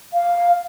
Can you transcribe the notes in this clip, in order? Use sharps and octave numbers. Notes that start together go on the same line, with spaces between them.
F5